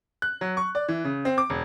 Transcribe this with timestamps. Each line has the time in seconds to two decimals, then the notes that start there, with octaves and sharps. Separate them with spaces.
0.22 F#6
0.41 F#3
0.57 C#6
0.75 D5
0.89 E3
1.04 C#3
1.25 C4
1.38 D6
1.50 E1